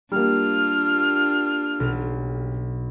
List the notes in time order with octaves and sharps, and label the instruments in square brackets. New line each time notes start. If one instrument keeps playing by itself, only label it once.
[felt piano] G3 A#3 [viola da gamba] D4 F4 [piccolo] F6
[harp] B1